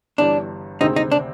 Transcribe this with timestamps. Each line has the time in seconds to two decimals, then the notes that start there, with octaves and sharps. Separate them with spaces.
0.18 G1 G2 E3 G3 D4
0.81 D2 C3 D#3 G#3 C4 D#4
0.96 D#4
1.12 D4